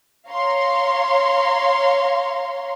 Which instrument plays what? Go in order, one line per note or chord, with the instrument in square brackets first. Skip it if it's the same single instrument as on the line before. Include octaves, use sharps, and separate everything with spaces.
[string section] C#5 F5 A#5 C6